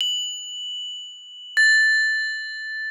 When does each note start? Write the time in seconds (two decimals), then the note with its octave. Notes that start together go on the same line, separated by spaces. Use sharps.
0.01 F#7
1.57 A6